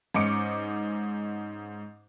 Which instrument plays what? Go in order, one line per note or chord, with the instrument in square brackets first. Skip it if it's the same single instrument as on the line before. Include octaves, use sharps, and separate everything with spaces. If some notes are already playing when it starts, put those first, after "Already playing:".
[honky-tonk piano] G#2 C#4 D#4 D6 C#7